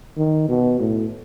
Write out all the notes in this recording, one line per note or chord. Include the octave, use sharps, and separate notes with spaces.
D#3
B2
A2